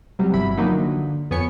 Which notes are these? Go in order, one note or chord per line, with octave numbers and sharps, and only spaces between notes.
C3 F#3 G3
G1 E3 E4 B5
D#3 F3 F#3 A#3 D4 D#4
D3
F2 B3 C#5 G#5 C#7